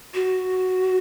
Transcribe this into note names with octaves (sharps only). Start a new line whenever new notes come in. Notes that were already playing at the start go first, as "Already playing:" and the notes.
F#4